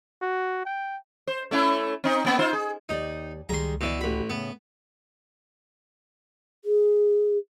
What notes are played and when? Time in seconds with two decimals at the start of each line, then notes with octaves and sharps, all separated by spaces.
0.22 F#4
0.65 G5
1.27 C5
1.51 A3 C#4 E4
2.04 C4 D#4
2.25 E2 A#3 B3
2.39 D#4 F4 C5
2.53 G#4
2.89 D#2 D#4 G4 D5
3.49 C#2 D#3 G3 G#3 A#5 C6
3.81 B2 E3 F#4 C#5 D5
4.01 A1 F#4 G4 B5
4.30 A2 C#3 B3
6.65 G#4